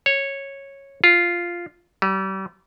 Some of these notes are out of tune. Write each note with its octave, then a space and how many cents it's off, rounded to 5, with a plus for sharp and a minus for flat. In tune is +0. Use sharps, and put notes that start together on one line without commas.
C#5 -10
F4 -5
G3 -35